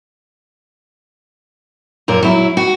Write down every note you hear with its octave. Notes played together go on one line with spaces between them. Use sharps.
F#2 A#2 A#4
F#3 E4
F#4